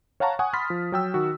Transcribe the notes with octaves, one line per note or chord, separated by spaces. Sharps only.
C#5 F5 F#5 A5 A#5 C#6
F#5 G#5 C#6 D#6
B5 C6 F6 A6 B6
F3
F#3 G5 E6
D#3 F#4